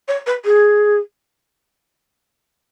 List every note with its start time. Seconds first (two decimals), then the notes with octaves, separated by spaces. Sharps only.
0.08 C#5
0.27 B4
0.45 G#4